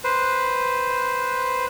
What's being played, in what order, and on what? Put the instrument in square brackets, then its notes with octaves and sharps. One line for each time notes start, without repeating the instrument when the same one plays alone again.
[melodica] B4 C5